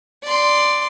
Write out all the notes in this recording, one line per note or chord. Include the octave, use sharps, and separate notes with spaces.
D5 C6